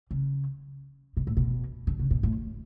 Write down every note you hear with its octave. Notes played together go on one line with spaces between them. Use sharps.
C#3
B2
A2
B2
D3
C#3
B2
A2